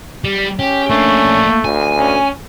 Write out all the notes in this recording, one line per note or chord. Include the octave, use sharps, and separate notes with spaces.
G3
C#4 G4
A3 A#3 D4
D2 G#5
C#4